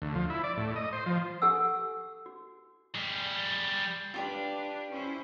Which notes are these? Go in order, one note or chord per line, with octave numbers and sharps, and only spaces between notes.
D2
F3
E4
D5
A2
D#5
C5
F3
G4 A4 F#5 G#5 E6
F#4
G3 G#4
D4 F4 G4 B4 D5
C#4 E4 C5